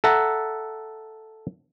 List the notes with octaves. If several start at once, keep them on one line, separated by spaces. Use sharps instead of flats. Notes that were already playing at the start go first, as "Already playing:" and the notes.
A4 E5 F#5 A#5